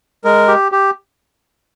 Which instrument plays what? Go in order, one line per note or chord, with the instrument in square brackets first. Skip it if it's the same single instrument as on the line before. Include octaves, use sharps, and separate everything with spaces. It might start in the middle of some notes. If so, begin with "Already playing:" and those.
[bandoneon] G#3 [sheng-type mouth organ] A#4
[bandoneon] G4
G4